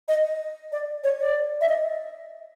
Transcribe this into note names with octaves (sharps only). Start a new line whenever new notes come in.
D#5
D5
C#5
D5
E5
D#5